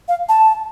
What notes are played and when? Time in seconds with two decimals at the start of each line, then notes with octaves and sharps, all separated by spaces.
0.08 F5
0.29 A5